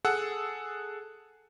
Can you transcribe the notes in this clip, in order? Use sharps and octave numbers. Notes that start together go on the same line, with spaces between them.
G#4 A4 F#5 E6